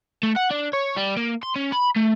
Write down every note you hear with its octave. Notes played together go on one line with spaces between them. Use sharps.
A3
F#5
D4
C#5
G3
A#3
C6
C#4
B5
A3